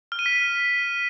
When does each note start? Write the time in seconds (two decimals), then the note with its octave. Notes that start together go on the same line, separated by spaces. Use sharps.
0.12 F6
0.19 D#7
0.26 B6